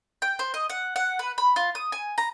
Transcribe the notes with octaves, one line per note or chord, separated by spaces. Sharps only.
G5
C5
D#5
F#5
F#5
B4
B5
F4
D#6
G#5
A#5